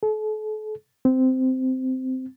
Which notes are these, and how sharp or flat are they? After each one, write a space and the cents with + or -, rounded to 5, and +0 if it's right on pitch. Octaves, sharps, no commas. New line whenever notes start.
A4 -40
C4 -15